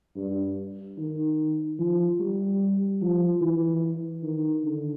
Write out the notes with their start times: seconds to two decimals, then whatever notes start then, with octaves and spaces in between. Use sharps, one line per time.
0.16 G2
0.98 D#3
1.79 F3
2.20 G3
3.01 F3
3.42 E3
4.24 D#3
4.64 D3